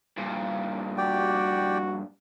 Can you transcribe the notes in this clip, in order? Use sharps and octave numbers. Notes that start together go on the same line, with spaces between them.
G2 A#2
F#4 G4 D5 G5